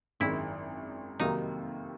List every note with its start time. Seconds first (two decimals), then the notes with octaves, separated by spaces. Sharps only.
0.20 G#1 F#2 D#3 G#3 E4
1.20 F2 C3 D#3 F#3 A#3 D#4